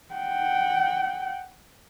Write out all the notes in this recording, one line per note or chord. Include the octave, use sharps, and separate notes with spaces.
F#5 G5